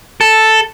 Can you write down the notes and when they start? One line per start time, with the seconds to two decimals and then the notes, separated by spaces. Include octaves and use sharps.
0.21 A4